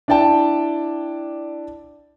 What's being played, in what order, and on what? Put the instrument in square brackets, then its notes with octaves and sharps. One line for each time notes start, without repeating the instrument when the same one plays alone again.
[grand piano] D4 E4 D5 G5 A5